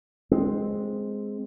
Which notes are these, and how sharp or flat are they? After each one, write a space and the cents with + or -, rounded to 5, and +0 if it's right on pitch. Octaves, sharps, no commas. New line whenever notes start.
G#3 +0 C4 +0